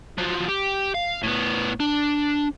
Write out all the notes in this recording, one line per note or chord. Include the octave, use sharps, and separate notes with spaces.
F3 F#3
G4
F5
A2 B3
D4